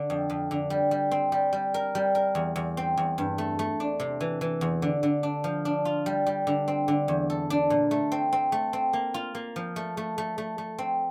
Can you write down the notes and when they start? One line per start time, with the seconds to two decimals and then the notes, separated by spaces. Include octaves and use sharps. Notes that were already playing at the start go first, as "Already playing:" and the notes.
Already playing: D3
0.10 F2
0.30 F2
0.51 D3
0.70 G3
0.91 G3
1.11 C4
1.32 G3
1.53 G3
1.74 A#4
1.95 G3
2.15 A#4
2.35 E2
2.56 E2
2.77 C4
2.97 E2
3.18 G2
3.38 A3
3.59 A3
3.80 D4
4.00 C3
4.21 E3
4.41 E3
4.61 E2
4.82 D3
5.03 D3
5.23 D4
5.44 F3
5.65 D4
5.85 F4
6.06 G3
6.26 G3
6.47 D3
6.68 C4
6.88 D3
7.08 E2
7.30 A4
7.50 D4
7.70 A#2
7.91 A3
8.12 C4
8.33 C4
8.52 A3
8.73 C4
8.93 A#3
9.14 F4
9.35 A#3
9.56 F3
9.76 A3
9.97 A3
10.18 A3
10.38 A3
10.58 A3
10.78 C4